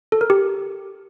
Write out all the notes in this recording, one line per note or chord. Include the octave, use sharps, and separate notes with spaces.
A4
A#4
G4